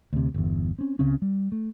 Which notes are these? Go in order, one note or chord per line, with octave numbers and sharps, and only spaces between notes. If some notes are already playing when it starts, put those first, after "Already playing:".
D2 C3
G1 E2
C4 C#4
C#2 C#3 C4 C#4
G3
A3